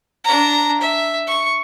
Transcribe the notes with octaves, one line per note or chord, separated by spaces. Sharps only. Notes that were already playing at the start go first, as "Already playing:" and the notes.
D4 A#5
E5
C#6